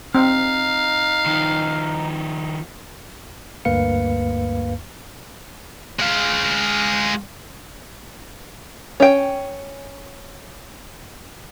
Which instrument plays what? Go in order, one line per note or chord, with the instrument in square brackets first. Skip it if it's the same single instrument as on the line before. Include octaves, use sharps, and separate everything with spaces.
[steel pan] C4 [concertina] D#4 [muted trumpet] F5
[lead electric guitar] D#3 F3
[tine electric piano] D2 G2 A#3 B4 F5 C#7
[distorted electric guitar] G#3 F5
[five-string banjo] C#4 G5